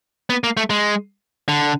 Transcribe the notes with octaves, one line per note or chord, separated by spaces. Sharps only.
B3
A#3
A3
G#3
D3